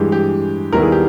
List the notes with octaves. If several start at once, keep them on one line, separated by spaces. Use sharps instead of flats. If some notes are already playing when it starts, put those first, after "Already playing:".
Already playing: G2 E3 G#3 G4 G#4
G4
D#2 D#3 G3 B3 E4 A#4
G#4
G4